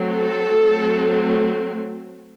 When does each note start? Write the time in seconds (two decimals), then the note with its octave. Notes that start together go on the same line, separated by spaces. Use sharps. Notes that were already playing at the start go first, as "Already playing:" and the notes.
Already playing: F#3 A3 C4
0.14 A4
0.68 F#3 A3 C4